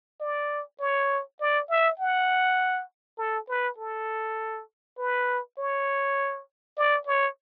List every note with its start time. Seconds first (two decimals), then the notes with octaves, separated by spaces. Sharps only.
0.20 D5
0.80 C#5
1.40 D5
1.70 E5
1.99 F#5
3.18 A4
3.48 B4
3.78 A4
4.98 B4
5.58 C#5
6.77 D5
7.07 C#5